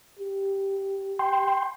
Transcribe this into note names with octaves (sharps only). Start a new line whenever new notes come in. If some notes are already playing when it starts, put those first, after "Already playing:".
G4
G5 C6